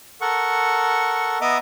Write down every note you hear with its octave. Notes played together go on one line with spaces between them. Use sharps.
A4 A#4 F#5 C#6
B3 D#5 E5 A#5 D6 D#6